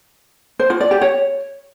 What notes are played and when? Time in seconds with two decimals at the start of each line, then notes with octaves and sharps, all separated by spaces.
0.60 C5
0.70 F4
0.80 D5
0.91 G4
1.01 C#5